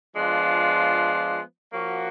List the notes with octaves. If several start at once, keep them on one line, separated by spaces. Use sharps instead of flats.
F3 G#3 B3 D4 F4
F3 A#3 C#4 F#4